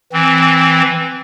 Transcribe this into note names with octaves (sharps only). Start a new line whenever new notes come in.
E3 C4